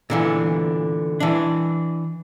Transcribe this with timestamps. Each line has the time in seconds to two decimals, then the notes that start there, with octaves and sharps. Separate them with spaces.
0.10 A#2 D3 E3
1.20 E3 D4